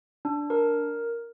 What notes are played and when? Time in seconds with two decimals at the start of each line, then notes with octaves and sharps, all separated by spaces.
0.25 D4
0.50 A#4